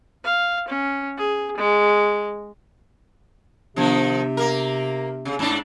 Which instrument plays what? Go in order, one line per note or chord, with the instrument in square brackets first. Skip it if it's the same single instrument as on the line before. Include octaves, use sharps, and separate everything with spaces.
[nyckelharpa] F5
C#4
G#4
G#3
[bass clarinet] C3 [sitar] D#3 F3 [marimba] B3 D4
[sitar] A#3 A#4
C#3
G#2 D4